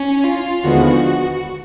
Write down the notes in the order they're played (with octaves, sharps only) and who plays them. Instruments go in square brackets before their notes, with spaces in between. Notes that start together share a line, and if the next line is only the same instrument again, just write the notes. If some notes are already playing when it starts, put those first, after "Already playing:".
Already playing: [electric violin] C#4
F4
[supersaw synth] D#2 D3 F3 G#3 B3 [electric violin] F#4